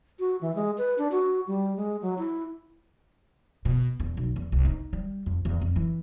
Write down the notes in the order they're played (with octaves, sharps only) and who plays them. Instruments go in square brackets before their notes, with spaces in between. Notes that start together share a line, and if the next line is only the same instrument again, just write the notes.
[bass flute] F#4
E3
G#3
B4
D4
F#4
G3
G#3
F#3
E4
[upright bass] B2
E2
B1
E2
C2
D#4
G3
F2
E2
F2
E3